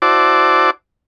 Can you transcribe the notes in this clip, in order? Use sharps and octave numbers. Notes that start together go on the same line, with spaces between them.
E4 F#4 C5 D5 A5 D6